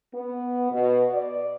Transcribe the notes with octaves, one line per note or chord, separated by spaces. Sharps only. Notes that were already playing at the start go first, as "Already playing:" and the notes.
B3
B2
D5